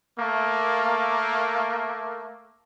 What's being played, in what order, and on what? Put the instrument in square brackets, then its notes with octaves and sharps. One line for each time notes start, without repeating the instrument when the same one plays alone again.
[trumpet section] A3 A#3